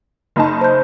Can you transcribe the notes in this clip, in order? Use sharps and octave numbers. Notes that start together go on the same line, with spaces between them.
F#1 D#4 A5
C5 G6